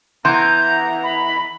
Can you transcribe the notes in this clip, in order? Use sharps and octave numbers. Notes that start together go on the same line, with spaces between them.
E3 B3 A#5 C6 G6
B5